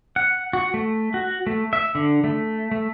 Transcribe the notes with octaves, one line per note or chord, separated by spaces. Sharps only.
F#5
F#4
A3
F#4
A3
E5
D3
A3
A3